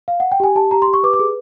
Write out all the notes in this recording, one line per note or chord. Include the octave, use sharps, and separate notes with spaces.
F5
F#5
G5
G4 G#5
G4 A5
G4 A#5
C6
G4
C#6
B4 D6
D6
G#4